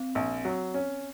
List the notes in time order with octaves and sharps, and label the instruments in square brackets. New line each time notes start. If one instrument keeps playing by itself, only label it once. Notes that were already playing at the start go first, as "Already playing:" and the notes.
Already playing: [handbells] C4
[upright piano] A#1
F#3
C#4